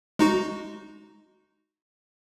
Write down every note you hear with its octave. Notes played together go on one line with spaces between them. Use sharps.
G#3 D#4 F#4